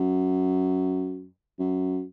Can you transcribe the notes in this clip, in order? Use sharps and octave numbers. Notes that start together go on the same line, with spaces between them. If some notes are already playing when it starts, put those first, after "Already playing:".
Already playing: F#2
F#2